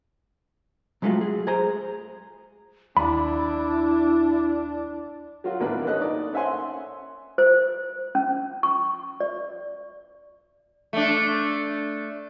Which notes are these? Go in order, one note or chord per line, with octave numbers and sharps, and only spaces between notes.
F#3 G#3 A3 C#4 F4 F#4
G#4
G#4 C5 A#5
D#2 D4 E4 B5
F#3 F4 F#4
A1 D#2 A#3 D4 B4
C#4 A4 D#5 F#6
D#4 D5
C#4 C5 E5 F#5 G#5 C6
C5
C#4
C#6
D5
A3 D4